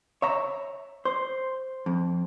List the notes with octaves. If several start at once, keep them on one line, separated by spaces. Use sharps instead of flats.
C#5 E5 A#5
C5
F2